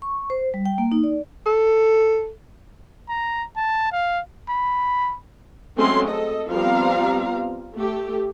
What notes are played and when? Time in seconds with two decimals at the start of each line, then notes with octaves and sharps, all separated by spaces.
0.02 C#6
0.30 C5
0.54 G3
0.65 G5
0.78 A#3
0.92 D#4
1.04 D5
1.46 A4
3.09 A#5
3.56 A5
3.92 F5
4.49 B5
5.77 F#3 G#3 A3 C4 C#4 C6
6.08 A4 D#5
6.49 F3 G3 B3 C4 F5 A#5
7.75 A3 G4